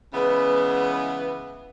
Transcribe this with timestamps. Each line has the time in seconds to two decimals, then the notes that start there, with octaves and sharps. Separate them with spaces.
0.13 C#3 E3 G#3 B3